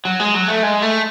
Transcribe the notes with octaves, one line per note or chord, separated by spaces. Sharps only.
F#3
G#3
F#3
A3
G#3
A3